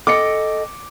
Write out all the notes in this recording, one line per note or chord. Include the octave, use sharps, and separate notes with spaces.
A4 D#5 G5 D6 C#7